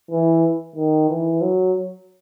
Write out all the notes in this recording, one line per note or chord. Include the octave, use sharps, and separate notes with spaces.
E3
D#3
E3
F#3